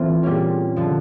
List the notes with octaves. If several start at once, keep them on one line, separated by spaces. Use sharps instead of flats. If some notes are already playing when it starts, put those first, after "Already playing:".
Already playing: A2 E3 A3 C4 F4
A#2 G3 A#3 C#4
D3 F3